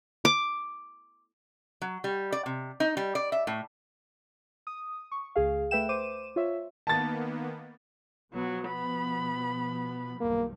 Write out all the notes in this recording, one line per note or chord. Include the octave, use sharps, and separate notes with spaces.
D6
F#3
G3
D5
C3
D#4
G3
D5
E5
A2
D#6
C#6
C#2 G#4 F5
A3 B4 E5 G5 E7
C5 D6 D#7 E7
F4 C#5 E5
D#3 A#3 B3 A5 A6
B2 F3 F#3 B3
B5
B1 E2 G2 A#3